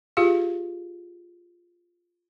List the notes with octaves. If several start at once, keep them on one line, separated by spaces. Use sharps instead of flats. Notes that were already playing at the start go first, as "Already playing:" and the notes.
F4 G4 G#4 F5